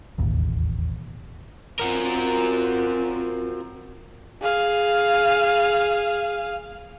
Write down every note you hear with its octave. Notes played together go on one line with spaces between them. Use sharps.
E1 A1 D#2
C4 F4 F#4 A#4
G#4 F5